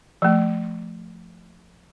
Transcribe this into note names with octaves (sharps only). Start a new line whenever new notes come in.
F3 A3